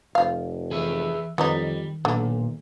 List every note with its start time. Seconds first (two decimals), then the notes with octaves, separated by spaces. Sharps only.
0.15 F1 F3 F5
0.71 E3 G#4 B4 E5
1.38 F2 D#3 E3 F#3 G3 D#4
2.05 B1 A#2 D3